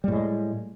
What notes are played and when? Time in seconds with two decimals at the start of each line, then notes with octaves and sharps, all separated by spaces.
0.04 G3
0.08 A2
0.12 G#3